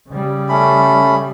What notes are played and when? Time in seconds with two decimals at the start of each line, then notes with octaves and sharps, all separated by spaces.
0.10 C#3 G3
0.49 A3 C#4 B5